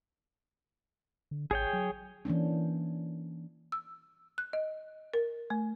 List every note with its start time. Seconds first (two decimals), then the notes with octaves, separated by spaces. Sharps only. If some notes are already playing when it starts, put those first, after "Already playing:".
1.31 D3
1.51 A1 G#4 C#5 G5
1.73 F#3
2.25 E3 A#3 C#4 D4
3.72 E6
4.38 F#6
4.53 D#5
5.14 A#4
5.50 A3